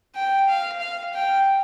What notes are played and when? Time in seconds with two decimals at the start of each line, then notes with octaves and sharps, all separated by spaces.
0.15 G5
0.48 F5
0.80 F5
1.14 G5